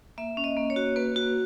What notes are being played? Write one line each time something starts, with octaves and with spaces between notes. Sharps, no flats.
A#3 E5
C#4
D#5
A#3
C#5
F#4
A#3 B4
F#4